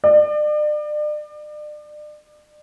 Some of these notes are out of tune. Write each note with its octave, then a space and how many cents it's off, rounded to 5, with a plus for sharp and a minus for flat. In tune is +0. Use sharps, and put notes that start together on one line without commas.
D5 +35